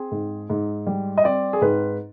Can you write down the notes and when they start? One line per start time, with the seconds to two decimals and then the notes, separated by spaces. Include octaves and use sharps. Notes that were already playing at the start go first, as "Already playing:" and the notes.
Already playing: C4 G#4
0.11 G#2
0.50 G#2
0.87 G3
1.18 D#5
1.24 C4 D5
1.53 G#4
1.61 G#2 B4